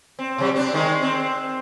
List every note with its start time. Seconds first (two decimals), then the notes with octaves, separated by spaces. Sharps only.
0.19 C4
0.38 C3 F#3 G3
0.55 C4 D4
0.74 D#3 G#3 D#4
1.02 C4